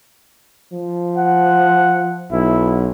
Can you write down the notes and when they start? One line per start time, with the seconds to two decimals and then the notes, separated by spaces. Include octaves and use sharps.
0.73 F3
1.17 F#5
2.32 B1 E4